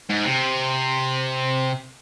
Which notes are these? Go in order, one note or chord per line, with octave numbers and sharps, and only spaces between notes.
G#2
C3